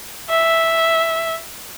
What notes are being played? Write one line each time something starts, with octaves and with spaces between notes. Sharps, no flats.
E5